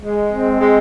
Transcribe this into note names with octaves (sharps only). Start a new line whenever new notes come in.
G#3
C4
G#3